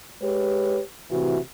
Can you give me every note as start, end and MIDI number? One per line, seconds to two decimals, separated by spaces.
0.22 0.80 56
0.22 0.80 67
0.22 0.80 71
0.22 0.80 73
1.11 1.39 45
1.11 1.39 48
1.11 1.39 52
1.11 1.39 66